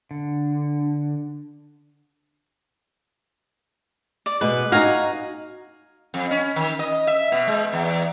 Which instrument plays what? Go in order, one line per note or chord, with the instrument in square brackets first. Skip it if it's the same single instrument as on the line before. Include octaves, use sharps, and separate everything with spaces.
[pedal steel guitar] D3
[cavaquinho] D5
[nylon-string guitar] B2 G#3 [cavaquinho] B4
[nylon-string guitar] D#4 F#4 [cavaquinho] F5 G#5 A#5
[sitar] F2
C#4
D#3
D#5
E5
B2
G#3
E2